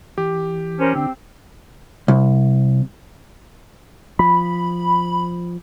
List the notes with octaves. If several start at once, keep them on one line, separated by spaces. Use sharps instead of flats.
E3 G4
C#4 A#4 C5 A5
D3 C4 D4 E6
C2
F3 B5